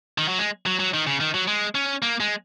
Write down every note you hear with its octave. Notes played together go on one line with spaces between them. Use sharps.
D#3
F#3
G#3
F#3
F#3
D#3
C#3
D#3
F#3
G#3
C#4
A#3
G#3